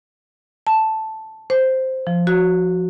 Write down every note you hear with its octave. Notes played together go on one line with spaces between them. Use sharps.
A5
C5
F3
F#4